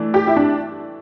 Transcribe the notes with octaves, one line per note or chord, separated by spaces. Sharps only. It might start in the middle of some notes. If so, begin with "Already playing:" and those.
Already playing: E3 A3 D4
G4
E4
D4